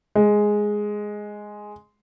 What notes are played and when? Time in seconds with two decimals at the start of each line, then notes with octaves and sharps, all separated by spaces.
0.15 G#3